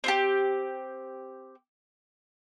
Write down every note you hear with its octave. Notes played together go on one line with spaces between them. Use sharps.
C4 F4 G4